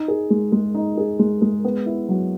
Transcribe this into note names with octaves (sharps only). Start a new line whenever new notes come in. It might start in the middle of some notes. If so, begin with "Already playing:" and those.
Already playing: D#4
G#4
G#3
G#3
D#4
G#4
G#3
G#3
B3
E4
F#3